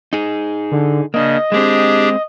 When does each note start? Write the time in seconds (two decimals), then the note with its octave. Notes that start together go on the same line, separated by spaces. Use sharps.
0.13 D#4 G#4
0.71 D3
1.14 C#3 A#3 D4 D#5
1.52 G#3 A#3 C4 D4 G4 G#4